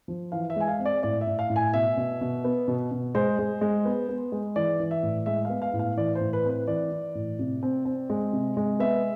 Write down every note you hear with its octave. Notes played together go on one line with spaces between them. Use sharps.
F3
E3 F5
E5
G#3 G#5
F5
C4
D5
A2 D5
E5
A2
F5
A2
G#5
B2 E5
B2
B2
B3
B2
B2
G#3 C5
G#3
G#3
B3
B3
G#3
E3 D5
E3
E5
A2
G#3 E5
B3 F5
F5
A2
F5
E3 D5
C5
A2
B4
C4 B4
E3 D5
E3
A2
C3
C4
C4
G#3
C3
G#3
B3 E5